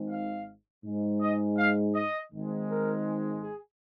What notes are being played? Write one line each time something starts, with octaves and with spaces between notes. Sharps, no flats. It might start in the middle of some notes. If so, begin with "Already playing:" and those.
Already playing: G#1 G#2 D#3 G#3
F5
G#2 G#3
D#5
F5
D#5
G#1 G#2 D#3 G#3
A#4
G#4